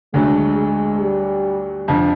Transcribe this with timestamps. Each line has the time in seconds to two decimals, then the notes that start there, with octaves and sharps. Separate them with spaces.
0.14 D2 D3 F#3 G#3 A3
0.58 G#3
1.01 G3
1.88 F2 D3 F3